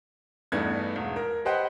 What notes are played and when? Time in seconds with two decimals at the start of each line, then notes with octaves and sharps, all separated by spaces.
0.52 E2 G2 A3 B3 D#4 G#6
0.96 E1
1.16 A#4
1.45 G4 B4 C5 D#5 F#5 G5